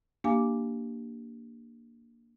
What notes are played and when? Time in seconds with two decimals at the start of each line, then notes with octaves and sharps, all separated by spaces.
0.24 A#3 D4 G4 F5 G#5 D6